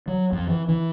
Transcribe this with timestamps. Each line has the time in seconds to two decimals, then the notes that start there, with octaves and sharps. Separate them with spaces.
0.08 F#3
0.32 F2
0.48 E3
0.69 E3